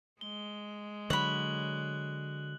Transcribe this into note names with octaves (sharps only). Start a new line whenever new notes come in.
G#3 G7
D3 F#3 C#5 B5 F#6 F#7